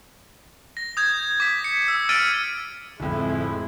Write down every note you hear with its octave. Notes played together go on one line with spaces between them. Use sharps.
A#6
D#6 G6 G#6
D6 B6
C#7
E6
E6 F6 A6 D7 D#7
D1 F2 G#3 E4